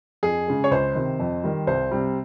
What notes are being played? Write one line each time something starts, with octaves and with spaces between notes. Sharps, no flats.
F2 G#4
C#3 G#3
C#5
C#2 C5
C3 D#3
F2
D#3 G3
C2 C5
C3 G3